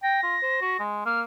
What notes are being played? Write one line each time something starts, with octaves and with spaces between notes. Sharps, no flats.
G5 A#6
F4
C5
F#4
G#3
A#3 F6